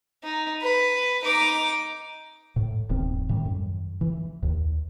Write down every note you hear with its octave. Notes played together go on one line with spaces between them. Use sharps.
D#4
B4
D#4 D6
A2
D1 G1 D#3 C4
A2 D#3 G3
F#2
E3
D#2